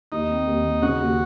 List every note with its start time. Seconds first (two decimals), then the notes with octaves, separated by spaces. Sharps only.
0.12 D#2 D#4
0.29 C4
0.47 D#2
0.64 D#2
0.82 C#3 F#4
1.00 D#2